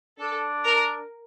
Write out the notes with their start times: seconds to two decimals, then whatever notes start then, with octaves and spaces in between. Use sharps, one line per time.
0.19 D4 A4
0.65 A#4